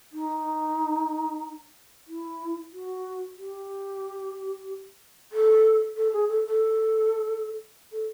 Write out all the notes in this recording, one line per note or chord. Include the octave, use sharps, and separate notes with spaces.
D#4
E4
F#4
G4
A4
A4
G#4
A4
A4
A4